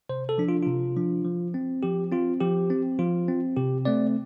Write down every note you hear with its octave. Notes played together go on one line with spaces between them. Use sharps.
C3 C5
A4
F3 D4
F4
C3 F4
F3 D4
F3
C4
F3 G4
C4 F4
F3 G4
C4
F3 F4
C4
C3 G4
A3 C4 D5